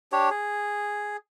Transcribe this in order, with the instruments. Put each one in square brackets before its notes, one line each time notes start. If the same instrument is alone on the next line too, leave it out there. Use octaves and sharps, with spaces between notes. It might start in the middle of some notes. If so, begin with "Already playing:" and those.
[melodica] D4 G4 C#5
G#4